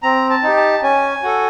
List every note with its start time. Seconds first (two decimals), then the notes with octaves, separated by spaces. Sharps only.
0.03 C4 A#5
0.30 A5
0.43 D#4 G4
0.57 A5
0.82 C#4 G#5
1.23 F#4 A4